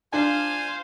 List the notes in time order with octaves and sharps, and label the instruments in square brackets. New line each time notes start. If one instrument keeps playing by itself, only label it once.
[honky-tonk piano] D4 [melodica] F4 [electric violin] C5 F5 [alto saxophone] G#5